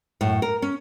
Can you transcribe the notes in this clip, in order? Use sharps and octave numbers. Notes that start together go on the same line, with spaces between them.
F#2 A2
A#4
C#4